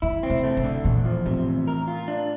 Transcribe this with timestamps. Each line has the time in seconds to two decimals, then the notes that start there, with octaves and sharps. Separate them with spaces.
0.02 D3 E4
0.23 C4
0.30 C3
0.43 A3
0.57 C3
0.64 D3
0.85 E2 A#2
1.05 F3
1.26 A2 C3
1.47 E2
1.67 A#4
1.88 F4
2.08 D4